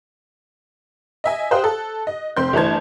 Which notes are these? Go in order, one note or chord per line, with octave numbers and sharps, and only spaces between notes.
D#5 E5 G#5
G4 C5 F5 G5 D#6 F#6
A4
D#5
F1 C4 C6 G6
G1 E3 A3 C5 A5 G#6